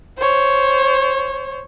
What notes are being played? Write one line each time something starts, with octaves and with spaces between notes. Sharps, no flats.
C5 C#5